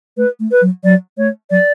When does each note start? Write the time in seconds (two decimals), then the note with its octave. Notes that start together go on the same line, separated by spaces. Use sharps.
0.17 A3 B4
0.40 A3
0.51 B4
0.62 F#3
0.84 F#3 D5
1.18 A3 C#5
1.50 F#3 D5